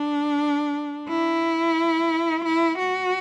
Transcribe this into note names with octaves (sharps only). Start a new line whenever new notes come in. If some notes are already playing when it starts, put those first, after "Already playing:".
Already playing: D4
E4
E4
F#4